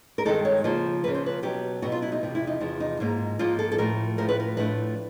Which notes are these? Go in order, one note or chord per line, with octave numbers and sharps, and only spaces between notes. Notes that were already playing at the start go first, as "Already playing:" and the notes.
A#4
G2 D#3 G#3 C4 D#4 A4
C#5
C#3 F3 A#3 C5
C#3 F3 A#3 B4
C5
B4
B2 F#3 B3 G4
B2 F#3 B3 F#4
F4
E4
D#4
E2 C3 F3
E4
D#4
E2 C3 F3
D#4
G#2 F3 A#3 D#4
G#2 F3 A#3 D#4 F4
A4
A4
A2 F3 A3 A#4
A2 F3 A3 A#4
B4
A#4
A2 F3 A3 D4 B4